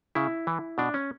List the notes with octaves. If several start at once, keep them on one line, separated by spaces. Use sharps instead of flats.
C#3 E4
E3
B2 D4
C#4